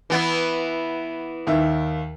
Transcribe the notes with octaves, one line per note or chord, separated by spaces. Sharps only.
E3 B3 E4
D#2 D#3 E5